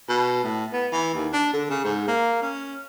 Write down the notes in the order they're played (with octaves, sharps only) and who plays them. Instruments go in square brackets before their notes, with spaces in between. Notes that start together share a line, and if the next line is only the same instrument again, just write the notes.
[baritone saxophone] B2
A2
B3
E3
D#2
D4
D3
C#3
G#2
A#3
C#4